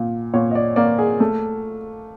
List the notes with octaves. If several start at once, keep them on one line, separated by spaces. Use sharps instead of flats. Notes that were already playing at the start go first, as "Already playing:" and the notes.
Already playing: A#2
A#2 C#5
D#5
D5
A#3 D5
G#4
A3